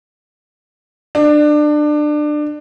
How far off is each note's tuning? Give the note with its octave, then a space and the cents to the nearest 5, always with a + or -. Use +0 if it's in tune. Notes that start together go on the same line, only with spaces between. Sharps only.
D4 +25